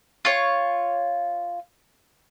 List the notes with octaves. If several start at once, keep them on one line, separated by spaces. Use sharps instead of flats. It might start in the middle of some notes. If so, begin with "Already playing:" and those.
F4 C#5